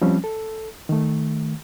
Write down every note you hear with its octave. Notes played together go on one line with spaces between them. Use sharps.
F3 G3 C4 C#4
A4
D#3 A3